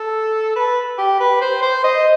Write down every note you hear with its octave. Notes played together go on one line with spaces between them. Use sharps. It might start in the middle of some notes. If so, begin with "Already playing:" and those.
Already playing: A4
B4
G4
B4
C5
C5
D#5